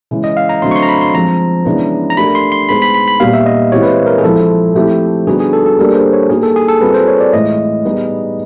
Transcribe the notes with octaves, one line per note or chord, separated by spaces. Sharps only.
C#3 E3 G#3
D#5
F5
A#5
D3 F#3 A3 C4 C6
C#6
C6
A#5
B5
C6
F3 G#3 C4 A#5
C#3 E3 G#3 B3 D4
A#5
A3 D4 G4 A#4 B5
C6
C6
G#3 B3 D#4 G#4 C5 B5
B5
B5
B5
A#2 G3 B3 D#4 G4 F5
E5
D#5
E3 G#3 C4 E4 G4 C#5
B4
C5
A#4
G#4
F3 G#3 C4 E4 A4
F3 A3 C4 E4 G4
D3 G3 B3 D#4 F#4 G#4
G#4
A4
A4
G3 A#3 D4 G4 A#4
C5
C#5
A#3 D#4 G4 G#4
A4
G#4
A4
G3 C4 F4 B4
C5
C#5
D5
A2 E3 G#3 D#5
G3 B3 D#4 G#4